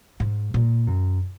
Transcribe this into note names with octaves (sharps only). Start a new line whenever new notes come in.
G#2
A#2
F#2